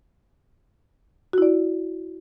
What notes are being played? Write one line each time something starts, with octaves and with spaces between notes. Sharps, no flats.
E4 F#4 D5